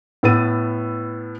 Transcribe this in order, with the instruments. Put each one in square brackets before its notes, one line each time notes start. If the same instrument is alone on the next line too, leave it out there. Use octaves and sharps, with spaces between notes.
[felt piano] A2 B3 E6 A6 D#7